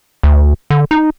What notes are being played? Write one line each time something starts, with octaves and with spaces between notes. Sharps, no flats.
D2
D3
D#4